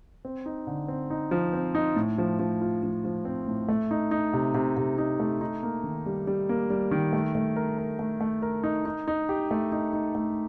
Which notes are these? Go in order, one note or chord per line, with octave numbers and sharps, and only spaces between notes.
C4
D#4
D3
C4
D#4
F3
C4
D#4
A2
F3
F3
F4
F3
F3
C4
A2
A3
D#4
D#4
C3
C3
C3
D#4
A3
D#4
A#3
D#3
G3
G3
A#3
G3
D#3
A3
A3
A#4
A#4
A3
A3
A#4
D#4
D#4
D#4
G4
A3
D#4
D#4
A3